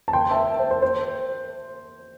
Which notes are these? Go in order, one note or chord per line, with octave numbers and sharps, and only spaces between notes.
A5
G5 C6
E5 A5
C5
C5
C5